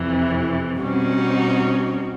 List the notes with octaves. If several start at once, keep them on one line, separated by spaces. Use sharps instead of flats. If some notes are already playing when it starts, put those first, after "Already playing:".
Already playing: F2 C3 E3
E4
B2 G3 C4 C#4 D#4 F#4